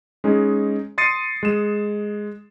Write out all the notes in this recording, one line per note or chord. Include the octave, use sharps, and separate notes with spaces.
G#3 C#4 D#4 G#4
C6 D#6 A6 C7 C#7 D#7
G#3 E7